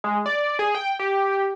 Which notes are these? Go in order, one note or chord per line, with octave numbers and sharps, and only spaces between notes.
G#3
D5
G#4
G5
G4